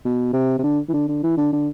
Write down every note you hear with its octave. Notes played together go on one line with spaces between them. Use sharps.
B2
C3
C3
D3
E3
D3
D3
E3
D3
D3